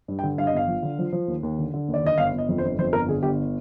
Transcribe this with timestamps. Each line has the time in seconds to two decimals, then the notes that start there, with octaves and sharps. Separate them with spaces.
0.08 G2
0.19 G5
0.23 D3
0.38 G2 F5
0.47 D#5
0.53 G1 F5
0.68 F3
0.83 D3
0.99 F3
1.13 F3
1.28 D#2
1.43 D#2
1.58 D3
1.74 D3
1.88 D#2
1.94 D5
2.03 D3 D#5
2.18 G1 F5
2.33 G1
2.38 D#5
2.49 F2
2.58 C5
2.64 G1
2.79 F2 C5
2.93 G1 A#4
3.08 D3 G#4
3.23 G1 G4